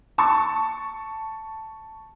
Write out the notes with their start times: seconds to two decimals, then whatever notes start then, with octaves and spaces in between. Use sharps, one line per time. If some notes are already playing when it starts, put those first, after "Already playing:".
0.18 A5 C#6